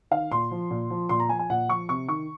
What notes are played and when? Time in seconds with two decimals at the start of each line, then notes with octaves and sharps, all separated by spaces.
0.11 D#3 F5
0.32 A#2 C6
0.51 F3
0.71 A#2
0.90 F3
1.09 A#2 C6
1.20 A#5
1.29 F3 G#5
1.39 G#5
1.50 A#2 F#5
1.69 F3 C#6
1.89 C3 C#6
2.09 D#3 C#6